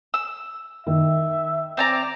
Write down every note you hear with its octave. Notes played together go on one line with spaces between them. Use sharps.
E6
D#3 E5
C4 D5 A#5